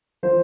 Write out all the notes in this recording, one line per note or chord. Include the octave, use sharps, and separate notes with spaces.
F3 C5